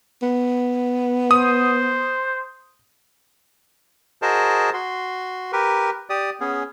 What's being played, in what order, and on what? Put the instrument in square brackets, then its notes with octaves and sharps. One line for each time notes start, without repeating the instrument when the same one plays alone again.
[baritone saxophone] B3
[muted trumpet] C5 [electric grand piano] D#6
[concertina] F#4 G#4 A#4 C5 D#5 A5
F#4 C6
G4 A#4 B4
G4 D5 D#6
B3 C#4 G#4